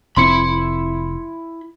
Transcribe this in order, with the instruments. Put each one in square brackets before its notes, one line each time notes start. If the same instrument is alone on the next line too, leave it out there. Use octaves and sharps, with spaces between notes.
[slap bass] F1 C4 [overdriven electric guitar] E4 B5 [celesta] C6 C#7